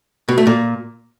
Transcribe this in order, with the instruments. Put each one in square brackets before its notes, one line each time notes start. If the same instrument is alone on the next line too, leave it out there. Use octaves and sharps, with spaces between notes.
[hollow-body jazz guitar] B2
A3
A#2